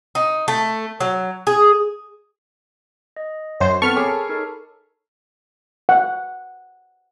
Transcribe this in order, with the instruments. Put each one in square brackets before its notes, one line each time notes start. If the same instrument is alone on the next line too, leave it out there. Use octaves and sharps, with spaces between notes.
[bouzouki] D#4
A3
F#3
G#4
[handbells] D#5
[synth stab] F#2 C5 [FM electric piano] C#5
[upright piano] B3 C4 [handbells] A4 [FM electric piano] A5 B5 [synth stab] C#6 F6
[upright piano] G#4 C#5 D6 [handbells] A#4
[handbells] D#4 A4 A#4
[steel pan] F#5